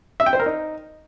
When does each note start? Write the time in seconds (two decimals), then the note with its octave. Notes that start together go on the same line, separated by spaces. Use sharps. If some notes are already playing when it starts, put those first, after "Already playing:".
0.20 E5
0.26 G5
0.33 C5
0.40 A#4
0.46 D#4